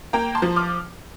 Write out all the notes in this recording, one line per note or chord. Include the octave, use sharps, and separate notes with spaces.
A#3 G5 A#5
A5 C6
F3
D6 F6